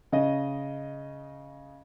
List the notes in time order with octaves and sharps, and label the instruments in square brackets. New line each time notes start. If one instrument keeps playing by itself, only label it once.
[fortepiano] C#3 D#5